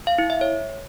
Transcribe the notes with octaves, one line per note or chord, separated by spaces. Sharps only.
F5
E4
E5
C#5